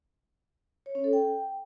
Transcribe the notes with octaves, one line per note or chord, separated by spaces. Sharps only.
C#5
C#4
A4
G5